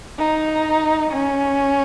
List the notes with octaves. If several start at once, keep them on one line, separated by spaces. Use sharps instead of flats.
D#4
C#4